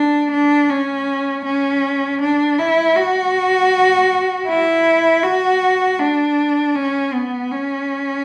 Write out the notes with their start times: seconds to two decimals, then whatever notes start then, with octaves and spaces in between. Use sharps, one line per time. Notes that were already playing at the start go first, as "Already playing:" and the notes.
Already playing: D4
0.32 D4
0.70 C#4
1.45 C#4
2.21 D4
2.59 E4
2.97 F#4
4.48 E4
5.23 F#4
5.99 D4
6.75 C#4
7.13 B3
7.51 C#4